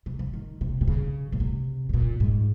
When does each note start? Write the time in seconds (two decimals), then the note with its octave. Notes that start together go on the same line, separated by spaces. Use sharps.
0.06 C3
0.19 C#3
0.34 D#3
0.61 C3
0.81 C3
0.88 C#3
1.32 A#2
1.40 C3
1.89 C3
1.94 A#2
2.20 G#2